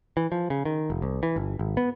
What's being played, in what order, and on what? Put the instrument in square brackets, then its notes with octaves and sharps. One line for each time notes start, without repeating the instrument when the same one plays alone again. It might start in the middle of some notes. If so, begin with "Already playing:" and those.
[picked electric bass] E3
F3
C#3
D#3
F1
C2
E3
G1
G#1
B3